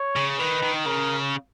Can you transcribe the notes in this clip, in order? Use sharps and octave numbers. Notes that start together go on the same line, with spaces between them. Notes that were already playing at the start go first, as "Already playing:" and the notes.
Already playing: C#5
C#3
D#3 B4
D#3
C#3 A#4